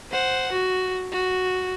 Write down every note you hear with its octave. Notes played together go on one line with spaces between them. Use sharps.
C5 F#5
F#4
F#4